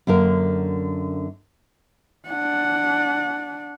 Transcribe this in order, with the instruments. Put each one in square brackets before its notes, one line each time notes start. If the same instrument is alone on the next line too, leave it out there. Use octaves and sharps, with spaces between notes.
[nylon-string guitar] F#2 D3 A#3 A#4
[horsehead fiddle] D4 F#5